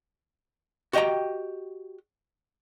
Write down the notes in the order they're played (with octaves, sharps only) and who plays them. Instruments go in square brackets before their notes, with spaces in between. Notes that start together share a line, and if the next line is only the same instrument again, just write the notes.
[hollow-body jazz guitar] F#4 G4 D#5 G5 A#5